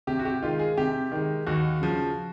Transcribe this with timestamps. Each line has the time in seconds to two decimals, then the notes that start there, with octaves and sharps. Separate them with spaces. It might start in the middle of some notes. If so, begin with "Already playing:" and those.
0.07 C3 G4
0.19 F#4
0.25 G4
0.42 D#3 G#3 F4
0.59 G#4
0.77 C3 G4
1.12 D#3 G#3
1.47 D#2 F#4
1.81 C#3 F3